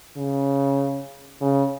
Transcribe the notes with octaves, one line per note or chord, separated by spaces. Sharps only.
C#3
C#3